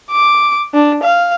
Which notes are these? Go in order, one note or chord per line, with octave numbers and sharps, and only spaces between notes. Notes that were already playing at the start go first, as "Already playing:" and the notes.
D6
D4
F5